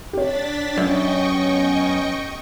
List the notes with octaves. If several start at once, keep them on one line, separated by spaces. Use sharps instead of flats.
D4 G4 C#5 A6 B6
F#2 B3 C#4 D#5 G5 C#6